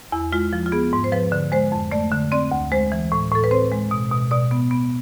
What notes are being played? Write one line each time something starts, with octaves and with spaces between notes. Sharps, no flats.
E2 E4
G#3 F4
F3
F4
B3 G#4
G#2
C5
F3 B4
D3
G#3 C5
F2
A3 D5
D3
C4 D5
D2
G#3 C5
E3
A2
A2 A4
B4
C4 C5
G#3
B2
B2
B2 D5
B3
B3